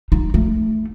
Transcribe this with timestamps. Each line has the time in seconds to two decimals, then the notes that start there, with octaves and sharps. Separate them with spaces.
0.12 D#4
0.34 A3